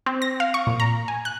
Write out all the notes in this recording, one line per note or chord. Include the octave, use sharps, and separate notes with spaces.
C4
A#6
F5
C#6
A#2
A#5
G#5
F#6